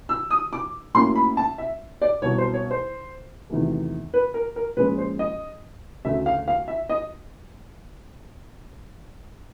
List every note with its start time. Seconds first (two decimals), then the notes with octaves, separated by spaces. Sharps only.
0.09 E6
0.31 D#6
0.53 D6
0.94 A2 F#3 A#3 C#4 C6
1.15 B5
1.37 A5
1.58 E5
2.02 D5
2.22 C2 B2 F#3 C#5
2.38 C5
2.53 C#5
2.71 C5
3.50 E2 C3 D#3 F#3 A3
4.14 B4
4.34 A#4
4.56 A#4
4.77 A#2 F3 G#3 C#4 B4
4.98 C5
5.19 D#5
6.05 D2 C#3 F#3 A3 E5
6.26 F5
6.48 F5
6.68 E5
6.89 D#5